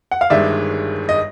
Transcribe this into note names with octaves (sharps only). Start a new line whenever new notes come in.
F#5
F5
G1 G2 D#3 G#3 D5 E5
D#5